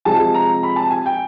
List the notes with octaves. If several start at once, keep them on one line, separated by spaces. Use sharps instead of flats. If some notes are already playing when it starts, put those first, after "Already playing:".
C3 F3 G#3 A5
A#5
B5
A5
G#5
G5